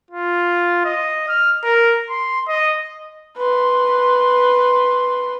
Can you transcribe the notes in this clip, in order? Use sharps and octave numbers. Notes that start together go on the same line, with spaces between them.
F4
D#5
F6
A#4
C6
D#5
B4 C6